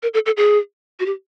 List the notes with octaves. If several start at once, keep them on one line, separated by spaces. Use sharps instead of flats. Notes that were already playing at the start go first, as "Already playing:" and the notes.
A#4
A4
A4
G#4
F#4
G4